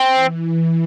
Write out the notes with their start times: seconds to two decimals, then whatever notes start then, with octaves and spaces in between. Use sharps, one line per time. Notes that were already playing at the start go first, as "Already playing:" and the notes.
Already playing: C4
0.13 E3